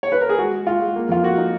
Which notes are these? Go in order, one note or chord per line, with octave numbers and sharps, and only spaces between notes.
C#5
B4
A#4
G#4
G#3 F#4
G#3
G#3 F4
G#3
A#3
F2 F4
A#3 F#4
D#4